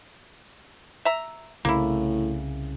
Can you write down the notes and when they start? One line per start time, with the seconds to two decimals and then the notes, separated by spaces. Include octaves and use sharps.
1.05 E5 A#5
1.65 C2 A2 C#3 A#3 E4